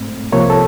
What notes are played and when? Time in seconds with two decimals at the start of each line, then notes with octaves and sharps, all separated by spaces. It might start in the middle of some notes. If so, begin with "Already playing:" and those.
Already playing: G#2 A3 C4
0.32 C2 C3 F3 A#3 C#5
0.50 A4